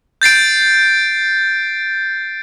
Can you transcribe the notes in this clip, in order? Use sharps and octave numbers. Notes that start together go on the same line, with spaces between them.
G6 A6 C7 D7